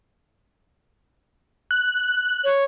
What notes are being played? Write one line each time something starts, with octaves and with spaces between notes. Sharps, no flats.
F#6
C#5